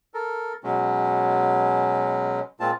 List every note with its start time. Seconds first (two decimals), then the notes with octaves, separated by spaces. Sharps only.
0.14 A4 A#4
0.64 B2 F#3 G#3 C#4
2.60 A#2 G#3 C4 F4 A5